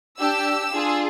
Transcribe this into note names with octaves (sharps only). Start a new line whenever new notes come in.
D4 G4 E6
D4 F4 G#4